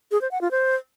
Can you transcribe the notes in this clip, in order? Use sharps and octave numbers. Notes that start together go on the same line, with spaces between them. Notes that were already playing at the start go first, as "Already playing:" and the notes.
G#4
C5
F#5
F4
C5